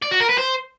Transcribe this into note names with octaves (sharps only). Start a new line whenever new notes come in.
D5
F#4
A#4
B4
C5